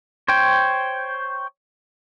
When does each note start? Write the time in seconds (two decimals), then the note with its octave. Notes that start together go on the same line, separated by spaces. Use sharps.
0.28 C5 C#5 G5